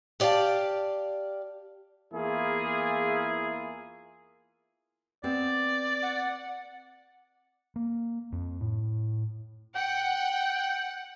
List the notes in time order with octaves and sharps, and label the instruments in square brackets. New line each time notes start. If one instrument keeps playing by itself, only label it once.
[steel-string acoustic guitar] G4 D5 F5 F#5 A5
[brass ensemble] E2 A#3 E4 F4 G#4
[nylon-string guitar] B3 C4 [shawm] D5
[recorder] F#5
[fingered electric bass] A#3
F2
A2
[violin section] F#5 [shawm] G5